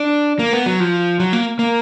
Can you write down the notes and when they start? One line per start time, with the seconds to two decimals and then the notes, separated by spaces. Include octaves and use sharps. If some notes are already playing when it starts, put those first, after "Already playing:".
Already playing: D4
0.39 A#3
0.53 B3
0.66 F#3
0.80 F3
1.20 F#3
1.33 A#3
1.59 A#3